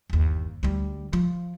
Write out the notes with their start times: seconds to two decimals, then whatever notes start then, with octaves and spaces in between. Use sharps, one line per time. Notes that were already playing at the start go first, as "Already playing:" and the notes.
0.10 G1 D#2
0.63 D2 G3
1.13 F3